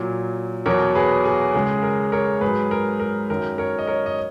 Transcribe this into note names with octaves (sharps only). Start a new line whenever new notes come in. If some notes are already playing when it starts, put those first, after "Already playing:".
Already playing: A#2 F#3
E2 B2 F#3 A#4 C#5
G#4 B4
G#4
C#2 C#3 G#3 G#4
A#4
A#4 C#5
G#2 F#3 G#4 B4
A#4
A#4
F#2 D#3 F#3 A#4
A#4 C#5
D#5
A#4 C#5
D#5